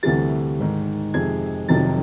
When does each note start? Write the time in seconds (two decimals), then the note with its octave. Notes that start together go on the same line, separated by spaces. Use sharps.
0.03 D2 C3 E3 G3 A6
0.59 G#1 G#2 D#3
1.14 F2 C3 D#3 G#3 G#6
1.68 F1 F2 C3 D#3 F#3 A6